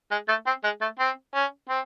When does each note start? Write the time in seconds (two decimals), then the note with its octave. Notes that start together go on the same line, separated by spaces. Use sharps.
0.11 G#3
0.28 A3
0.46 C4
0.64 G#3
0.81 A3
0.99 C4
1.34 C#4
1.69 C4